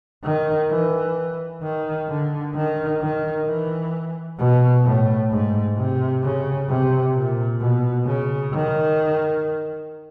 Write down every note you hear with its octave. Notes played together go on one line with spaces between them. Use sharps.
D#3
E3
D#3
D3
D#3
D#3
E3
B2
A2
G#2
C3
C#3
C3
A#2
B2
C#3
D#3